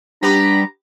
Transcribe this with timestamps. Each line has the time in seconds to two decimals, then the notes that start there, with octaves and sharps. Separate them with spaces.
0.23 G3 B3 D4 G4 B4 A#5